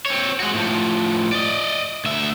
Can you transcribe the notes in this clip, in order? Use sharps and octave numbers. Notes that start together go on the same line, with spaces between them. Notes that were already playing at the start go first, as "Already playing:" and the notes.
C4 C#5
G#3 F#4
A2 F3
D5 D#5
D2 E5